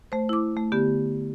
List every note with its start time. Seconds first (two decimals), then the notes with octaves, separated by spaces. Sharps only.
0.12 A3 C5
0.29 E4 D6
0.57 A3
0.72 D3 B3 G4